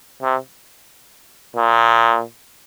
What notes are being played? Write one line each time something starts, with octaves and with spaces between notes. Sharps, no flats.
C3
A#2